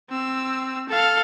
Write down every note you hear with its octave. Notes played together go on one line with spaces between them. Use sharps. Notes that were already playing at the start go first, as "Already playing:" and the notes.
C4 E6
A4 F5